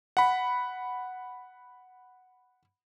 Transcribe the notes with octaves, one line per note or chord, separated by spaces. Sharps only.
F#5 B5